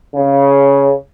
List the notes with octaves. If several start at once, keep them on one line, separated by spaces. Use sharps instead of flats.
C#3